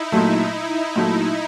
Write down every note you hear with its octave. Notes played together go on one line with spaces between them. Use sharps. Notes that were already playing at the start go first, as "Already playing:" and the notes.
Already playing: D#4 E4
A#2 F#3 A3 D#4
A#2 F#3 A3